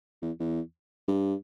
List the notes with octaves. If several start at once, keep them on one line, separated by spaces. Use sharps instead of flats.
E2
E2
G2